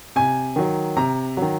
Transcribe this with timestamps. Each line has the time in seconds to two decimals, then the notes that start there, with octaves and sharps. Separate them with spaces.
0.16 C3 G#5
0.56 D#3 F#3
0.97 C3 A#5
1.37 D#3 F#3